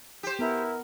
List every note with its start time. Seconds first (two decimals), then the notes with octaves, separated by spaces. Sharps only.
0.23 G4 C5
0.39 B3 E4 A#4